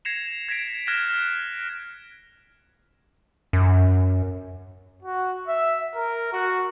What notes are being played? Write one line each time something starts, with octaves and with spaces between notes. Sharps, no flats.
G#6 A#6 C7 C#7 E7 F7
G#6 A#6 B6 D7 E7
F6 F#6 G#6 A#6 E7
F#2
F#4
E5
A#4
F#4